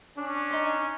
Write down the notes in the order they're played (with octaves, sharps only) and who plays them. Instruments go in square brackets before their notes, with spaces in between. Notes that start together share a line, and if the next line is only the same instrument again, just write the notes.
[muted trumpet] C#4 [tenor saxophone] D4
[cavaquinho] D#4 C6